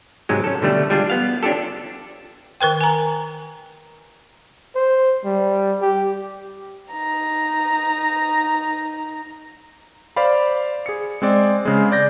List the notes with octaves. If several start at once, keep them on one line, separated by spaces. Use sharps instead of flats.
G#2 C3 F#3 G#3
C#4 A4
B2 D3 G3 A3
G3 G#3 D4 F4
B3 F5
C#4 D4 F4 G4 A4
D#3 A#4 B4 G5
G#5 A#5
C5
G3
G4
D#4 A#5
C5 D5 F5 B5
G#4 C#7
G#3 C4 D5
C#3 G#3
D5 G6 A#6